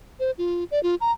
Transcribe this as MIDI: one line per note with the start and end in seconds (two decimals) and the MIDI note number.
0.20 0.31 72
0.38 0.64 65
0.71 0.82 74
0.83 0.95 65
1.01 1.12 82